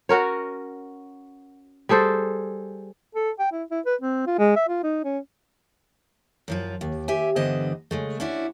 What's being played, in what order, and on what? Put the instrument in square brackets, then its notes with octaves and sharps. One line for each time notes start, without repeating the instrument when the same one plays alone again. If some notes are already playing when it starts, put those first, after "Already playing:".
[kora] C#4 F#4 A#4 C#5
G3 G#4 A4 C5
[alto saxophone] A4
G5
E4
E4
B4
C4
F4
G#3
E5
F4
D#4
C#4
[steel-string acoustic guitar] F#2 F3 F4
D#2
G4 E5 G#5
G2 D3 E3 B3 C5 D#5
C#3 G#3 A3
C#4 D4 E4 F#4